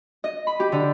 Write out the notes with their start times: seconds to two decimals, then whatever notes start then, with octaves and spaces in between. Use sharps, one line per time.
0.24 D#5
0.47 B5
0.60 G4
0.72 D3